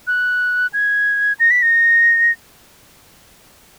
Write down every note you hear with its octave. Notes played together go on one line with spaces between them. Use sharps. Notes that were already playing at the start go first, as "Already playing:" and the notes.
F#6
G#6
A#6
B6
A#6